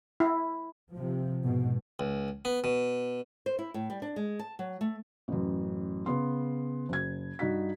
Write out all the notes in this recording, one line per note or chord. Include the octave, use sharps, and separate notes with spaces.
E4
C3 F3
G#2 B2
C#2
B3
B2
C5
E4
A2
G3
D4
G#3
A5
F#3
A3
A1 F#2
C#3 B3 C6
F#1 G#6
G2 D#4 F#4 B6